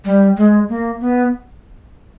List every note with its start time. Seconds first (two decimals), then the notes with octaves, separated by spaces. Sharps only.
0.05 G3
0.37 G#3
0.69 A#3
1.01 B3